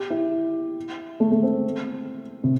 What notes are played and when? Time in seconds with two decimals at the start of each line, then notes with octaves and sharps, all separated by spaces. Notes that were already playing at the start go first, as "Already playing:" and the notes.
Already playing: G4
0.10 E4
1.20 A3
1.32 A3
1.43 C4
2.44 C3